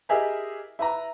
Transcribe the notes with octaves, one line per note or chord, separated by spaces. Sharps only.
E4 G4 G#4 A#4 D#5 E5
E4 B4 A#5